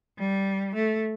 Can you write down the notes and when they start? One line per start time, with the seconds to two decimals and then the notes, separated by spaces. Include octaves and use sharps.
0.18 G3
0.75 A3